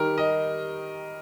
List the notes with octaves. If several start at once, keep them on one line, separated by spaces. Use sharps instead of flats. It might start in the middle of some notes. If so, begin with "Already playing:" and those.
Already playing: D#3 G3 D#4 G4 A#4
D#5